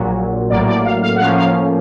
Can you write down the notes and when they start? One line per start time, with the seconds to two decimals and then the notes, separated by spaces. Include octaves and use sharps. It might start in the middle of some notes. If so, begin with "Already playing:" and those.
Already playing: A#1 A#2 F#3
0.50 A1 A2 F#3 A#3 D5
0.68 D5
0.85 F5
1.03 F5
1.16 F#5
1.20 A2 F3 A#3 C#4 F5
1.37 F5